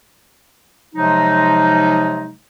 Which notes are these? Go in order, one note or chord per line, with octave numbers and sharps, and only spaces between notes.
C3 F3 F#3 G#3 D#4